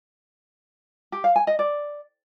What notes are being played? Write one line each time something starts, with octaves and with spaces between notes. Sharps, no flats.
G4
F5
G#5
D#5
D5